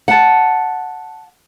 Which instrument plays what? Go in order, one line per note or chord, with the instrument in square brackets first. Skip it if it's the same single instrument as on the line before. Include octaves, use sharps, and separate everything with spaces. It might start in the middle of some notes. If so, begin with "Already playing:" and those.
[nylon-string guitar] F#5 A5